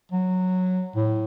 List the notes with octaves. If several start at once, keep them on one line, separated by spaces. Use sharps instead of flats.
F#3
A2